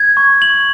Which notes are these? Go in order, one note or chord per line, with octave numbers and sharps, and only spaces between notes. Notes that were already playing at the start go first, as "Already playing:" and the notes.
Already playing: G#6
C#6
F#7